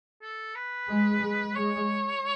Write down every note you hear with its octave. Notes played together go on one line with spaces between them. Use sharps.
A4
B4
G#3
G#3
G#3 C#5